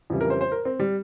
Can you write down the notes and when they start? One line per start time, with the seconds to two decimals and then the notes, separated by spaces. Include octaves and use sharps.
0.10 F2 C#3 E3 G3
0.21 A#4
0.30 C5
0.41 C5
0.52 A#4
0.65 C4
0.79 G3